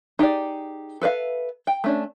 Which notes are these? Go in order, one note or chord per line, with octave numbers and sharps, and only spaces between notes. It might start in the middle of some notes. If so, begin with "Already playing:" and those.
D#4 G4 G#4 D5
A4 B4 E5 F5
G5
A3 C#4 D4